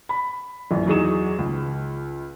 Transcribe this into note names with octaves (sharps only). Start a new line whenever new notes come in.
B5
A#1 F#2 E3
E2 F#3 D#4 G#4 C#6 E7
C#2